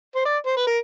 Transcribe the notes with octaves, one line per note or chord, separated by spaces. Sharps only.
C5
D5
C5
B4
A#4